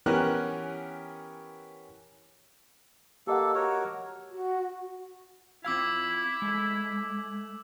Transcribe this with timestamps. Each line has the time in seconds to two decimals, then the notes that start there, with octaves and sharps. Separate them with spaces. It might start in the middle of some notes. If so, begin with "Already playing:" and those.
0.06 E3 B3 C#4 G4 A#4 F#6
3.27 A#3 G4 A4 D#5 F#5
3.55 F#4 A#4 C#5
4.32 F#4
5.65 C4 E4 F4 F5 D6 E6 G#6
6.42 G#3 A3